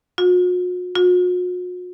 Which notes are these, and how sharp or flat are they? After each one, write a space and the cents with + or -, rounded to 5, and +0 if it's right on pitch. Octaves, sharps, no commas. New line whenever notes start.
F#4 -45
F#4 -45